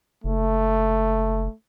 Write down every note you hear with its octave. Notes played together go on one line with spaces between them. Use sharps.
F#1 A3